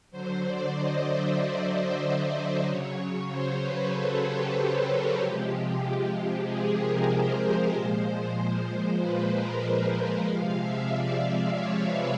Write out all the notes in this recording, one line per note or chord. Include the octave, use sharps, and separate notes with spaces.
D3 F#3 C5
D5
D#5
E5
D#5
D5
D5
C#3 F#3 C#5
C5
B4
A4
G4
A4
A#4
C3 F3 G#3 G4
G#4
A#4
C5
A#2 F3 G#3
B4
A#4
B4
C3 F3 G#3 F5
E5
D5
C#5
B4